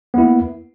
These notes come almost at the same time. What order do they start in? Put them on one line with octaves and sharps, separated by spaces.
B3 E4 A#3